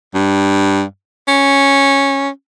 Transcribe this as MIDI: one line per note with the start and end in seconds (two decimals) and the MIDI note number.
0.15 0.83 43
1.28 2.29 61